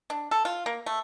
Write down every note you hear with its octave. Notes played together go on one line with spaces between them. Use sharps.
D4
A4
F4
A#3
A3